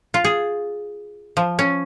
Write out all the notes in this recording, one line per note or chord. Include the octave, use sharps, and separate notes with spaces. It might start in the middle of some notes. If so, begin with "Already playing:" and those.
F4
G#4
F3
C#4